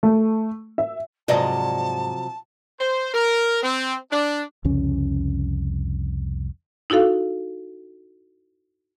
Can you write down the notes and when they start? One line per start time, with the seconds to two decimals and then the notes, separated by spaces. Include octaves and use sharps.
0.03 A3
0.78 E5
1.28 G#2 C3 F3 F#3 D5 D#5 A5
2.80 C5
3.14 A#4
3.63 C4
4.11 D4
4.65 C2 F2 C#3 C#4
6.90 D#4 E4 F#4 A4 F5